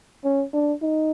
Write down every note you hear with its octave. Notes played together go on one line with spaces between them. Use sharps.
C#4
D4
D#4